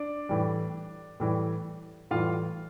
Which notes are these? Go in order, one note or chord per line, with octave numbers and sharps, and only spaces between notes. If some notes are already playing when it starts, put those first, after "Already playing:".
Already playing: D4 D5
A2 E3 G3
A2 E3 G3
A2 E3 G3 F4 F5